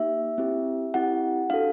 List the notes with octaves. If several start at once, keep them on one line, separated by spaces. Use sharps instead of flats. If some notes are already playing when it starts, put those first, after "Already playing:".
Already playing: A#3 D#4 G4 E5
C4 E4 G4
C4 E4 G4 F#5
D4 F#4 A4 F5